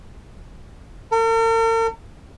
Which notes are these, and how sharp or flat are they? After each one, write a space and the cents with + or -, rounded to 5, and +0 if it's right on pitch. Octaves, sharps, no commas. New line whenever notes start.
A#4 -45